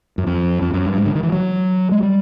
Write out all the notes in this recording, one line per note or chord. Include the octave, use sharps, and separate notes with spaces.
F#2
F2
F2
F#2
G2
G#2
D3
D#3
E3
F#3
G#3
G3